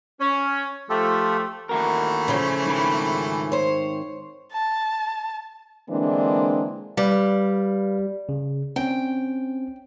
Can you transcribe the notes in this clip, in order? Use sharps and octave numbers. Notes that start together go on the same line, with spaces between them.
C#4
F3 A3 F4 G4 A4
D#2 E3 A3 F#4 A#4
C#3 F3 C#4
G#2 D#3 B5
C5 C#5
A5
D3 E3 G#3 A#3 C4 D4
G3 B4 F5
C#3
C4 C#4 G5